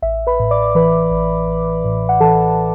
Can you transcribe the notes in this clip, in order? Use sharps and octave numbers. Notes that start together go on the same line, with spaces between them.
A1 E5
B4 B5
A2
D5 D6
E3 B4 B5
A1
A1
A2
F#5
E3 A4 A5